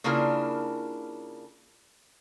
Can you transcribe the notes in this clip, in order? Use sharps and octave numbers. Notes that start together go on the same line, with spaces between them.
C#3 A#3 D4 E4 F4 A#4